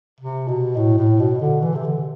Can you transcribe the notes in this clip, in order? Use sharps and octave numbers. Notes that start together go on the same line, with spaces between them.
C3
B2
A2
A2
B2
D3
E3
C3
D3